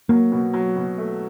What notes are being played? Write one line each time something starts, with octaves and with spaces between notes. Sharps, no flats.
F#3 A#3
B2
F#3
B2
A3